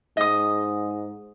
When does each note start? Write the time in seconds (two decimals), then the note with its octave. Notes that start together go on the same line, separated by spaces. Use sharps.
0.17 G#2 D#5 D#6